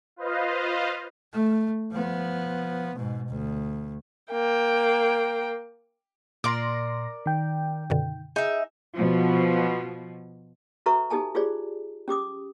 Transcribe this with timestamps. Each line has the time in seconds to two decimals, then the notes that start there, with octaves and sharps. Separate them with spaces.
0.16 F4 B4 C5 D#5 F5
1.33 A3
1.92 F3 B3
2.96 G#2 B2
3.28 D2
4.32 A#3 G5
6.44 A#2 A#4 D5 C6 D6 A#6
7.26 D#3 G5
7.90 F#2 B2 D3
8.36 D#4 G#4 E5
8.94 B2 F3
10.86 F#4 A4 B4 E5 A#5 C#6
11.10 D#4 G4 A4 G#5 A5
11.35 F4 G4 G#4 C5 D5
12.08 C#4 G4 D6 D#6